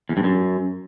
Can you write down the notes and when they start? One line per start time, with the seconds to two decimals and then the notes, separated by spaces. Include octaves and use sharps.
0.09 E2
0.17 G2
0.24 F#2